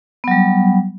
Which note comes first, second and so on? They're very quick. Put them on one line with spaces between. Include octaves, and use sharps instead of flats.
B3 F#3 G3